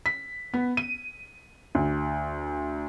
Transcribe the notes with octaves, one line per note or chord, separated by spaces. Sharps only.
B6
B3
D#7
D2